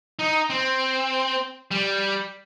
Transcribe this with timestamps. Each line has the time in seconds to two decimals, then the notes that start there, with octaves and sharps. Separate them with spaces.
0.19 D#4
0.50 C4
1.71 G3